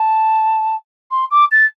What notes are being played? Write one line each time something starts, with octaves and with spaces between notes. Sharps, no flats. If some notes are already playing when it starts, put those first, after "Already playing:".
Already playing: A5
C6
D6
A6